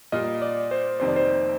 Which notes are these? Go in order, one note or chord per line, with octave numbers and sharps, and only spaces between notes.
A#2 G3 A#3 F4 D#5
D5
C5
F1 F2 D#3 G3 C5
D5
C5